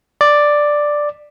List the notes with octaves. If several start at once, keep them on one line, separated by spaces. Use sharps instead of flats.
D5